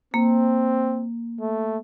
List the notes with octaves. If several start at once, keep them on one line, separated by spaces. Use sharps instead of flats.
A#3 C4
A3